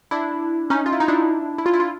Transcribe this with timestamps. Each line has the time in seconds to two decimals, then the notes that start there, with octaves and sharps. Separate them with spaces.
0.11 D4 E4
0.70 C#4 D#4
0.86 F4
0.92 E4
1.00 D#4
1.08 D4 E4
1.58 E4
1.66 F4
1.73 E4
1.80 F4